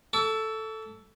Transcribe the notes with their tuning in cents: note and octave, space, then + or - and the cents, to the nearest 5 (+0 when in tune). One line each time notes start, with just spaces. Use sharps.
A4 +0 C#6 +45